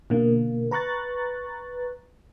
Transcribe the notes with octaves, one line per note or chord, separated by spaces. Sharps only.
B2 D3 A#3
B4 A#5 C#6 F#6 A6